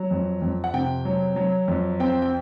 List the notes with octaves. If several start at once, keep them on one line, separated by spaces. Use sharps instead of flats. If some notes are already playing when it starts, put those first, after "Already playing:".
Already playing: F#3
F2
F2
F#5
C3 G5
F#3
F#3
F2
C4 G5
G5